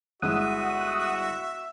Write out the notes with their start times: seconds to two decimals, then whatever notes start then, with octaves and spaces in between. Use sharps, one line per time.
0.22 G1 G#3 E4 F#4 E5 F#5 D#6